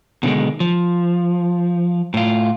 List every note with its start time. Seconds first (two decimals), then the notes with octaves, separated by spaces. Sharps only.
0.23 B2 D3 D#3 G#3
0.60 F3
2.14 A2 F4